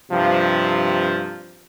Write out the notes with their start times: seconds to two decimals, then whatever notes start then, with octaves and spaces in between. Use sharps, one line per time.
0.12 G2 C3 F3